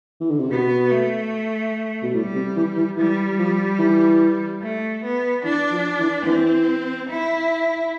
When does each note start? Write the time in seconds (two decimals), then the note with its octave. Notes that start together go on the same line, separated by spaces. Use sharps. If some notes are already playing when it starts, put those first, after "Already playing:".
0.21 E3
0.31 D3
0.40 C3
0.51 B2 B3
0.91 A3
2.03 B2
2.14 A2 G3
2.35 C3
2.56 E3
2.77 E3
2.97 E3 G3
3.38 F3
3.79 E3
4.61 A3
5.03 B3
5.44 E3 D4
5.72 F3
5.99 E3
6.26 E3 C4
7.09 E4